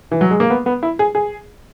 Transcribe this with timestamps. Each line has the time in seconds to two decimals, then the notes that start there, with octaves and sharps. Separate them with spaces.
0.11 E3
0.21 F#3
0.31 G#3
0.40 A#3
0.50 B3
0.66 B3
0.83 E4
0.99 G#4
1.15 G#4